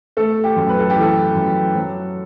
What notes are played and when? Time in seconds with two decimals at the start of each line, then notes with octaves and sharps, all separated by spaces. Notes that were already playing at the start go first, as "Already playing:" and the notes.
0.17 A3 A4
0.44 G4
0.56 F#2
0.69 B4
0.80 A4
0.90 G4
0.96 E3 A4
1.35 F#2
1.75 F#3